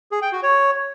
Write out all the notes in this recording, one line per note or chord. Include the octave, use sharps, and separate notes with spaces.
G#4
G5
F#4
C#5